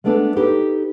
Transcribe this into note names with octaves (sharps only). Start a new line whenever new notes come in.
G#3 A3 B3 D4 G#4 A4
D#4 G4 A4 B4